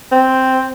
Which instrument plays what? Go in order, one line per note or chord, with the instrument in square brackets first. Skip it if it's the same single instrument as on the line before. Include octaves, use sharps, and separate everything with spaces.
[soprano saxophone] C4